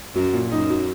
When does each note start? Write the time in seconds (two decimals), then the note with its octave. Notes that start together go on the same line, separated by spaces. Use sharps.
0.15 F#2 F#3
0.33 A#2
0.51 F#2 D#4
0.70 F#3